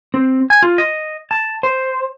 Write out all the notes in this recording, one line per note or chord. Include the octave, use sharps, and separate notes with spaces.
C4
G#5
F4
D#5
A5
C5